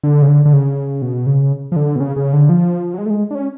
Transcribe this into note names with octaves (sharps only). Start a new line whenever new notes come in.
D3
C#3
D3
D3
C#3
B2
C#3
F3
D3
B2
C#3
C#3
D3
F3
F#3
G#3
A3
G#3
D4
C#4